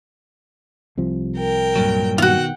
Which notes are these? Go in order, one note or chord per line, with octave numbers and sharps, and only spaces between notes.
C2 C3 F3
A#4 G5
G2 A#2 F#3
B2 D#3 F4 F#4 F#5 G5